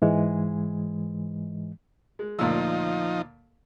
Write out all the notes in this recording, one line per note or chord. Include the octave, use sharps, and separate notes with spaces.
G#2 E3 G#3
G#3
D2 A#2 F3 D#4 E6